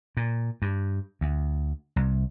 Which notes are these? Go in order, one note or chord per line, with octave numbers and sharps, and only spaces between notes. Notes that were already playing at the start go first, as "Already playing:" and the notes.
A#2
G2
D2
C2